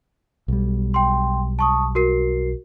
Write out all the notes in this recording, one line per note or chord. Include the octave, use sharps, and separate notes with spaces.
B1 G3
G5 C6
A5 C#6 D#6
F#4 A#4 C7